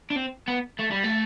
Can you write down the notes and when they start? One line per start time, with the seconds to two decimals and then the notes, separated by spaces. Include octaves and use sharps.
0.10 D4
0.16 C4
0.48 B3
0.79 A3
0.91 G3
1.03 A3